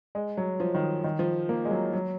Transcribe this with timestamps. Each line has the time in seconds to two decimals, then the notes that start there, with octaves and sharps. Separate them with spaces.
0.15 G#3
0.37 F#3
0.60 F3
0.75 D#3
1.04 D#3
1.19 F3
1.49 A#3
1.65 G#3
1.71 F#3
1.93 F#3